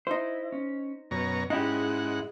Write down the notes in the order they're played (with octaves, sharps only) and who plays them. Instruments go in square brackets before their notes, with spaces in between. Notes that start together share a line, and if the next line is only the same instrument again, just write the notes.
[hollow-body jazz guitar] D#4 C5 [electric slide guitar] E4
[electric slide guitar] C#4
[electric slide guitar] F#2 [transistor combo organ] B2 C#5 A#5
[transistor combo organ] G#2 F#5 [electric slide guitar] C#4 [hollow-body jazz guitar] D#4 E4 G4 [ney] G#4